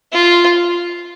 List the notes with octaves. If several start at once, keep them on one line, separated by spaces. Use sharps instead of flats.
F4